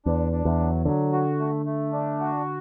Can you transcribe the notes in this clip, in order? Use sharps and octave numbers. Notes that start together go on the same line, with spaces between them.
E2 D4
D4
E2
F#3
D3 F#3
F#4
A3
A3
D4
F#4